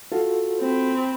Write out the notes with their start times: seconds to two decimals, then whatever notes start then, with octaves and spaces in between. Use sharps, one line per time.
0.12 F4 F#4 A4
0.60 C4 B5